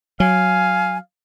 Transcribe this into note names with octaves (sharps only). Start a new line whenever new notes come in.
F#3 F5 G#5